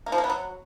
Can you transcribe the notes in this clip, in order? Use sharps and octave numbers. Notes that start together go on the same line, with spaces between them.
A#3
F3
A#3
B3
F#3